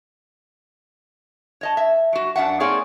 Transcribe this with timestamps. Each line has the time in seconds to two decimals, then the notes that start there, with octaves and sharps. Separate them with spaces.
1.61 C#5 D#5 A5
1.77 E5
2.13 F#3 F#4
2.36 F#2 D4 E5 F#5
2.60 A#3 C4 D#4 G#4 C#5 D5